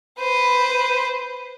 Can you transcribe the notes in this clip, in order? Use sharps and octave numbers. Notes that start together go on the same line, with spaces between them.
B4 C5